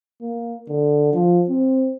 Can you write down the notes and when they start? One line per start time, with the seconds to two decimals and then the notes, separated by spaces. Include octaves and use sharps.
0.22 A#3
0.69 D3
1.14 F3
1.49 C4